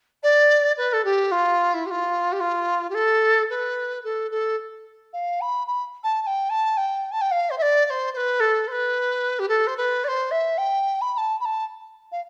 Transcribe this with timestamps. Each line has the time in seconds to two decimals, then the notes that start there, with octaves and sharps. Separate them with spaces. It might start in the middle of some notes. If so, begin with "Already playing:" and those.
0.23 D5
0.77 B4
0.93 A4
1.04 G4
1.31 F4
1.74 E4
1.86 G4
1.90 F4
2.32 G4
2.40 F4
2.90 G4
2.94 A4
3.49 B4
4.04 A4
4.31 A4
5.13 F5
5.41 B5
5.67 B5
6.03 A5
6.22 A5
6.26 G5
6.49 A5
6.77 G5
7.11 A5
7.21 G5
7.31 F5
7.50 C5
7.58 E5
7.62 D5
7.85 D5
7.90 C5
8.13 C5
8.16 B4
8.40 A4
8.67 C5
8.71 B4
9.39 G4
9.48 A4
9.67 C5
9.77 B4
10.04 D5
10.08 C5
10.31 E5
10.57 G5
11.01 B5
11.13 B5
11.17 A5
11.40 B5
11.45 A5
12.12 F5